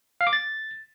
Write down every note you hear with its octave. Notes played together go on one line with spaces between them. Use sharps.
F5
D6
A6